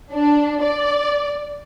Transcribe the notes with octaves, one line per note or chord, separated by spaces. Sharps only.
D4
D5